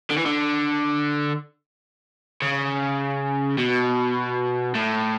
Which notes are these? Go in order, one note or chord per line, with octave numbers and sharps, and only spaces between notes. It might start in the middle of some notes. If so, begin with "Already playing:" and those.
D3
E3
D3
C#3
B2
A2